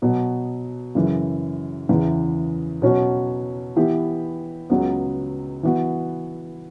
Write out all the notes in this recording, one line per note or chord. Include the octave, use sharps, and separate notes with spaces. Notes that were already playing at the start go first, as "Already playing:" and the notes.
B2 F#3 B3
F#2 C#3 E3
E2 C#3 E3
B2 F#3 C#4 F#4
E3 B3 E4 G4
C#2 C#3 F#3 B3
E3 B3 F#4